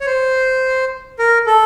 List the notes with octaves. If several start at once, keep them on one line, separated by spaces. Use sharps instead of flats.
C#5
C5
A#4
A4